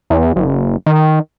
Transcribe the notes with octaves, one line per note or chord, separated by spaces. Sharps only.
E2
F#1
D#3